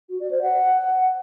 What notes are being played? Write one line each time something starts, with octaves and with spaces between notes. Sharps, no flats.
F#4
D5
C5
F#5